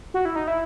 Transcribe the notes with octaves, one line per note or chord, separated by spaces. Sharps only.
F#4
E4
D#4
E4